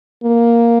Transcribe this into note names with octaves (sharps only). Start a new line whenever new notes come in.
A#3